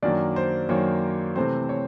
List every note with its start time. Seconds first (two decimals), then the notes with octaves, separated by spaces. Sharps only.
0.02 F#2 D#3 F#3 A#3 D4 D5
0.36 C5
0.69 F#2 D#3 F#3 A#3 C#5
1.36 C3 E3 A3 C4 C5
1.69 C#5